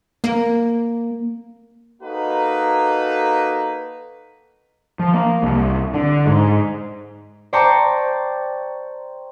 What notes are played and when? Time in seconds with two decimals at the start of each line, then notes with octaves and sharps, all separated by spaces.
0.24 A#3
2.03 A#3 D#4 F#4 A4 B4
4.99 F3
5.14 A#3
5.43 C2
5.94 D3
6.26 G#2
7.53 C5 D5 G5 A5 A#5 C#6